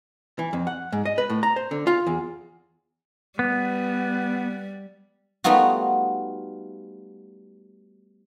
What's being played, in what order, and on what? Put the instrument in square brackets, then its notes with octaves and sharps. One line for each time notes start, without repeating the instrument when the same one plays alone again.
[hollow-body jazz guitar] E3
F2
F#5
G#2
D#5
B4
A2
A#5
C5
D3
F4
E2
[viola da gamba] G3 [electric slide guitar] B3
[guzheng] G3 A3 B3 D#4 F4 F#4